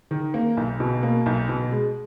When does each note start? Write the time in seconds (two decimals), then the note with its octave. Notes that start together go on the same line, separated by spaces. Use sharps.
0.11 D#3
0.34 A#3
0.57 B1
0.80 B2
1.03 A#3
1.26 B1
1.49 B2
1.72 G#3